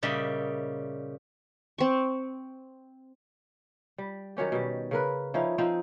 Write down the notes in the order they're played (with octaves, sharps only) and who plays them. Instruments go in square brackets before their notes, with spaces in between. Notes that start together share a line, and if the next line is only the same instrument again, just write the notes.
[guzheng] A#2 C#3 G3 D#5 E5
[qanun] C4 C#6
[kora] G3
D#3 F#3 C#4 G4
B2 G3
C#3 A#4 B4
F3 C#4 D#4 E4
F3 C4 D#4